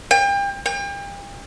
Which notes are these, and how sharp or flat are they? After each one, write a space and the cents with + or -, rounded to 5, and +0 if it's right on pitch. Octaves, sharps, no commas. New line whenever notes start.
G5 +35
G5 +40